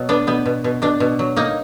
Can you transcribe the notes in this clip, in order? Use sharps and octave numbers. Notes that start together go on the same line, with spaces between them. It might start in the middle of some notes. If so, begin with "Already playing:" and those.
Already playing: B2 F#3
B3 D4
B2 B3
B2
B2
B2 D4
B2
F#3
A#3 D#4